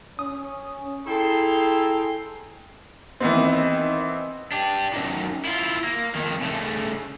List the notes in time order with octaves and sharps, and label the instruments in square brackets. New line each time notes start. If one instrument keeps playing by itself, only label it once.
[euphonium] C#4 [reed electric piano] D#6
[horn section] E4 G#4 A4 G5 A#5 C6
[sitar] D#2 D#3 [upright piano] E3 B3 C4
[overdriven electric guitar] D4 G4
F#2 D#3
E4 F4
A#3
F2 D#3
C#3 A3